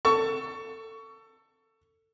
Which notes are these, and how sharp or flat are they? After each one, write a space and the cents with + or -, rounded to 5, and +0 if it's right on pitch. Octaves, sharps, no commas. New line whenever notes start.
A4 +20 C#6 +20